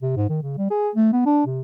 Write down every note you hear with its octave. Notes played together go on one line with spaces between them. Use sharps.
C3
G#2
D#3
C#3
G3
G#4
A3
B3
D4
C3